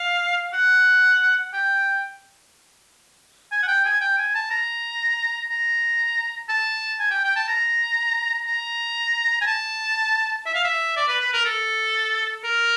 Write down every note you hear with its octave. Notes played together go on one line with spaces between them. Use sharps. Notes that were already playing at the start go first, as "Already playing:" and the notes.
Already playing: F5
F#5
G5
G#5
F#5
G5
G#5
G5
G#5
A5
A#5
A#5
A5
G#5
G5
G5
A5
A#5
A#5
G#5
A5
E5
F5
E5
D5
B4
B4
A#4
A4
A#4